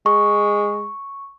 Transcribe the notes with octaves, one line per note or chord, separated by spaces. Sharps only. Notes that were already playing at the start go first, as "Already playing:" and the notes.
G#3 C#6